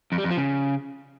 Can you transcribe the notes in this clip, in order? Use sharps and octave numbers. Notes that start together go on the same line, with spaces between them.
F2
G3
F2
F3
C#3